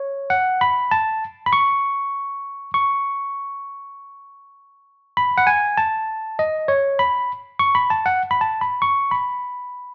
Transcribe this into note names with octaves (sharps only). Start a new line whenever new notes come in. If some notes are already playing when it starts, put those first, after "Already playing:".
Already playing: C#5
F#5
B5
A5
B5
C#6
C#6
B5
F#5
G#5
A5
D#5
C#5
B5
C#6
B5
A5
F#5
B5
A5
B5
C#6
B5